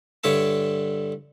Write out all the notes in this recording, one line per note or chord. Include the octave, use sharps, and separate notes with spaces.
G2 D3 C#5 E5 A5